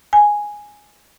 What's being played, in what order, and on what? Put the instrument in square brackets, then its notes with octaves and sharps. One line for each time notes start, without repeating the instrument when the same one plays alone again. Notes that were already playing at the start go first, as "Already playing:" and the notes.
[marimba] G#5